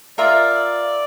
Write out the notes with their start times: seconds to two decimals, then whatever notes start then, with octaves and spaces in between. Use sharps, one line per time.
0.18 F4 A#4 D5 E5 A#5